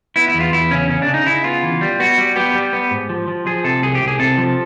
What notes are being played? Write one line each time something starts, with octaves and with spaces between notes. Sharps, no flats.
B3 E4
E4
E2
F4
E2 E4
C#3 C#4
C#3 C#4
D4
C#3
D#4
C#3 E4
B3 F4
E3
G3
B3 F#4
G3
B3 G4
G3
B3
G#2
F3
F3
F3 G#4
C3 A4
C2 G#4
G4
C2
G#4
C3 A4
F3